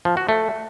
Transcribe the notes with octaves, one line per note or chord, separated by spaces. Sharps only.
F3
F#4
A3